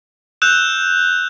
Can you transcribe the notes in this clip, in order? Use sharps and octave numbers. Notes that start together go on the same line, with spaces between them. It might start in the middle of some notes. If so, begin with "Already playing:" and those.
E6 F#6 G6 E7 F7